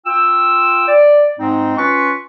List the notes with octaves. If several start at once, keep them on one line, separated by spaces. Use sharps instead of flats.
F4 G5 E6
D5
G#2 G#3 C4 D#4
C#4 F4 B4 C#6